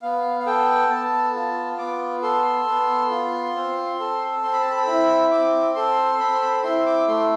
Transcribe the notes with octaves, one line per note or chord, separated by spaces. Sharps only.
B3 F5
F5
A4 G5
B3 A5
F4
B3 D6
A4 C6
C6
B3
F4
C4
A4
C4 C6
B5
A5
B5
E4
C4 D6
A4 C6
C4 B5
C6
B5
E4 C6
D6
A3 C6